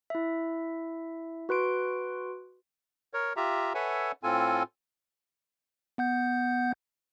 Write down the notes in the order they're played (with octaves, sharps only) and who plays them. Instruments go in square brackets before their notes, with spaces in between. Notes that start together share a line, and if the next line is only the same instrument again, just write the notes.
[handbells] E4 E5
F#4 B4 C6 D7
[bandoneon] A#4 C#5
F4 G4 E5 A#5
A4 B4 C#5 E5 F#5 G#5
A2 C4 F4 A4 G#5
[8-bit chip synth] B3 F#5 G6